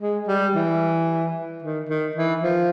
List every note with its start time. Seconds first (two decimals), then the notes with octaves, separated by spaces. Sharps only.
0.01 G#3
0.28 G3
0.55 E3
1.62 D#3
1.89 D#3
2.16 E3
2.43 F3